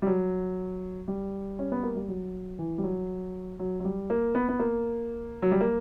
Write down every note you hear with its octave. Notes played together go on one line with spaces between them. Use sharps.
G3
F#3
G3
C#4
B3
A#3
G3
F#3
E3
G3
F#3
F#3
F#3
G3
A#3
B3
B3
A#3
F#3
G3
A#3